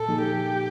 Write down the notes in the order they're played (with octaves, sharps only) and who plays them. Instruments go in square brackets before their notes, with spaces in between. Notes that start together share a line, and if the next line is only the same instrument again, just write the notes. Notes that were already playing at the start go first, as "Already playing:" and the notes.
Already playing: [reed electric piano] A#2 [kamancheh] A4
[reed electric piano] F3 A#3 D#4 G#4
[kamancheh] G4